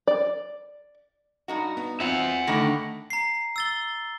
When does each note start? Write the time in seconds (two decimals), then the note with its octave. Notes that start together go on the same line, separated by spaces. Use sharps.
0.07 D5
1.48 G2 D#4 F#4
1.77 B3
2.00 C4 F4 E5 F#5
2.47 D3 D#3 A3 B5 C#6 A#6
3.10 A#5 C7
3.56 E6 A6 G7